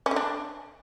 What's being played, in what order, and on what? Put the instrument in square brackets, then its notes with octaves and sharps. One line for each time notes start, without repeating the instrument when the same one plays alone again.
[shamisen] C#4
D3
D4